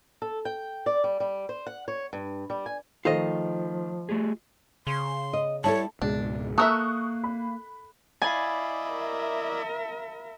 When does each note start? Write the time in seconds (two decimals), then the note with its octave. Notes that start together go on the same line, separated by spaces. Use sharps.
0.22 A4
0.45 G5
0.86 D5
1.04 G3
1.20 G3
1.49 C5
1.67 F#5
1.88 C#5
2.13 G2
2.50 G3
2.66 G#5
3.05 D#3 F3 A3 F4 C5 D#5
4.09 A3 G4 G#4
4.87 C#3 C6
5.33 D#5
5.64 G3 E4 A4 C#5 A5
6.02 C#2 G#2 B2 G#3 D4
6.58 A#3 A4 A#4 E5 C#6 D#6 F#6
7.24 B5
8.22 E4 D5 D#5 F5 G#5 B5 A6
8.87 A#4 E5